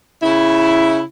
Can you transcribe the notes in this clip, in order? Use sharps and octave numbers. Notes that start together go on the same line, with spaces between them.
C#3 E4